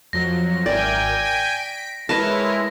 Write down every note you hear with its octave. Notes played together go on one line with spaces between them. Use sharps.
F2 F3 F#3 A#6
G#1 A#4 D5 E5 G5 G#5
B6 D7
G#3 E4 A#4 B4 C#5 D#5 A5 A#6